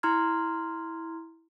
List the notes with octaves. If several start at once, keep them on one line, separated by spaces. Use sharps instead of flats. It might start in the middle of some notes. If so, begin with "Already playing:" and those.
E4 A#5 C6 F6 G#6